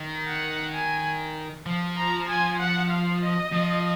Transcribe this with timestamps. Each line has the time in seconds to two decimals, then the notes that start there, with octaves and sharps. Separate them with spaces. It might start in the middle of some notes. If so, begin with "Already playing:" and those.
Already playing: D#3
0.27 F#5
0.73 G#5
1.66 F3
1.97 A#5
2.28 G#5
2.59 F#5
2.90 F5
3.21 D#5
3.52 F3